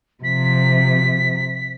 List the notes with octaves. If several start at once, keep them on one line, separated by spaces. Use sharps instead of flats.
C3 F3 B6